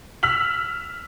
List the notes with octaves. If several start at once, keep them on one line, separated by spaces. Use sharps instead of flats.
E6 F6 B6 F#7